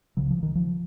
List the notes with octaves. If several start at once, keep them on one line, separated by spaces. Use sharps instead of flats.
C#2 C#3 F#3
F3
D#3
F3